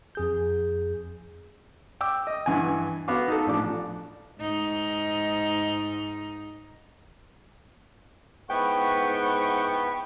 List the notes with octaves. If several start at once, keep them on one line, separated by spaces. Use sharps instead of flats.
F2 G#4 G6
G5 D6 E6
D#5
G2 E3 F#5 G#5
B3 F#4 F5 D6
D#4 A4
A1 F3 D4 D6
G#2 D#4
G#2 B3 E4 B4 F#5 G5 C#6